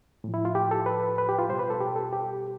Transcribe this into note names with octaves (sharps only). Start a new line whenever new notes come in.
A2 F3
E4
F4
G4
A4
B4
B4
G4
F4
B2 G3 C5
B4
A4
G4
A4
G4